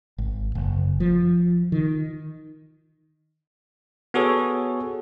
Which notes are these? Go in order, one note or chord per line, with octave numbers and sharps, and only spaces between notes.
G#1
F#1
F3
D#3
B3 F#4 G#4 A4 C#5